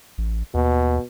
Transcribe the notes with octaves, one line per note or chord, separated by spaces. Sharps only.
A1
D#2 B2